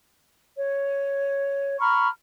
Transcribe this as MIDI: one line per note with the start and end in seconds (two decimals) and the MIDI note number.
0.55 1.77 73
1.79 2.07 82
1.79 2.07 83
1.79 2.07 85
1.79 2.07 89